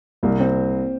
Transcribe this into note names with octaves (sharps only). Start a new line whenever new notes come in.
C2 A#3
C4